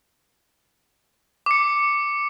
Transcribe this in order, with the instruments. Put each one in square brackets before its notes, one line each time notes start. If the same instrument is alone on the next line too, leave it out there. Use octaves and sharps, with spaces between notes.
[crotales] D6 C#7